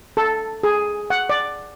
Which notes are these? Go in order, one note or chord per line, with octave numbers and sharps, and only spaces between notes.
A4
G#4
F#5
D5